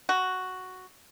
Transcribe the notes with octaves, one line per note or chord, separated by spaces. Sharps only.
F#4